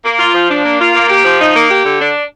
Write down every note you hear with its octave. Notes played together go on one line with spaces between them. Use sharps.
A#3
F4
F3
D4
A#3
F4
A#3
G4
F3
D#4
A#3
G4
D3
D4